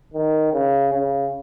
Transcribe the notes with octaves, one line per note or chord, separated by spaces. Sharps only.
D#3
C#3
C#3